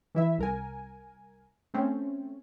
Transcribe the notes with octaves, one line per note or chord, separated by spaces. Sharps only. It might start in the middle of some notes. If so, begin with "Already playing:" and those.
E3 E4 E5
C2 A#4 G#5
A3 C4 C#4